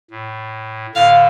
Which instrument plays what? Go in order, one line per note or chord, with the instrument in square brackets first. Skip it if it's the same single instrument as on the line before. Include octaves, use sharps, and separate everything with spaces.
[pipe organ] A2
[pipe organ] A2 D3 [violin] F5